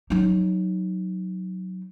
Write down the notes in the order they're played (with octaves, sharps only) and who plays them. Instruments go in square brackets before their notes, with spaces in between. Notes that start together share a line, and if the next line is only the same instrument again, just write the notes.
[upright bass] F#3 D#4